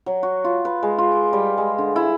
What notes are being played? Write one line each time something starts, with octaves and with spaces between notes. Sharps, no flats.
F#3
F#4
F4
B4
G#3
F4
D6
G3
G#3
D3
E4